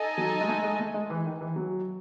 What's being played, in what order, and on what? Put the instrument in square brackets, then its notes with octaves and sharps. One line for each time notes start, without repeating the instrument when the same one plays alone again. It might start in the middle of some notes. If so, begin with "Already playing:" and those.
Already playing: [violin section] D#4 A4 D#5 G#5
[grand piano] F#3
G#3
A3
G#3
A3
G#3
E3
D#3
E3
F#3